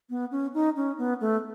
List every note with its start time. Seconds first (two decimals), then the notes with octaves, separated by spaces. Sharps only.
0.10 B3
0.31 C#4
0.54 D#4
0.76 C#4
0.98 B3
1.21 A3